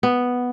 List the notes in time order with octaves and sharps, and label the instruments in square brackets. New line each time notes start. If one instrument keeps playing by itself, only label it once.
[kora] B3